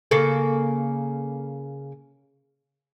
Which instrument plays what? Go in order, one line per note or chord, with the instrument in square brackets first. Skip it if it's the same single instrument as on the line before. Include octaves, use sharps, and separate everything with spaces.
[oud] C#3 A#3 A4